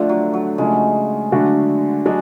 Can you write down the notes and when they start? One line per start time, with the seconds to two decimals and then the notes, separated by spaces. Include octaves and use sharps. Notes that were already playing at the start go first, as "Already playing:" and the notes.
Already playing: D3 F3 A3 D4 F4
0.09 F#3
0.34 F#3
0.58 C#3 F3 G#3 A3
1.32 D3 F#3 A3 D4 F#4
2.06 F#3 G#3 D4